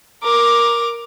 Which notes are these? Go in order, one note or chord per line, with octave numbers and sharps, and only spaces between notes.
A#4 D6